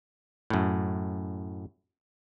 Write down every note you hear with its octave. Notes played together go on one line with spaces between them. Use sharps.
F#2 A2